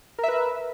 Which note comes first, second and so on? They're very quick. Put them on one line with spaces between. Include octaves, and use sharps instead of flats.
A#4 E5 B4